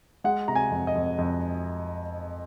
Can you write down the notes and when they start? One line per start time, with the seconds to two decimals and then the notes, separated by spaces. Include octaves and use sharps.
0.24 G#3 F#5
0.48 C3 A#5
0.55 G#5
0.71 F2
0.87 D#5
0.95 F2
1.18 F2